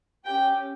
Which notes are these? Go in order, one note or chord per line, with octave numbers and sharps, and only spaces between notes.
C#4 G4 G5